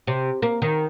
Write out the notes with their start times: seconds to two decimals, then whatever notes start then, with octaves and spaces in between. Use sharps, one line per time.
0.07 C3
0.42 A#3
0.62 D#3